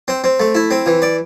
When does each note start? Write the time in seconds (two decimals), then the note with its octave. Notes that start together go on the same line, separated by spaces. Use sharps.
0.08 C4
0.24 C4
0.40 A3
0.55 E4
0.71 C4
0.86 E3
1.02 D5